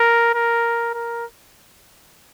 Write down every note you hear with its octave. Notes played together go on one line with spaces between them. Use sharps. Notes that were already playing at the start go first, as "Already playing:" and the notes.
Already playing: A#4
A#4
A#4